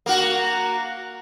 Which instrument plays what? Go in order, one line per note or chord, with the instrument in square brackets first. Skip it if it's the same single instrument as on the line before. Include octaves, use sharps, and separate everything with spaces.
[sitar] A#3 F#4